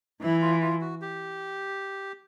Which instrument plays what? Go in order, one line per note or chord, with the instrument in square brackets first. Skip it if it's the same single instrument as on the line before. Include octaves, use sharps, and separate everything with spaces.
[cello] E3 [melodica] E4
[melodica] F4
F4
F#4
G4